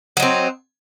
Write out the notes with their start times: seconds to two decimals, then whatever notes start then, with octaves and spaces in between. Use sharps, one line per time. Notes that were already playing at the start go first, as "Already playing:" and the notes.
0.17 F#3
0.20 D#4
0.22 C4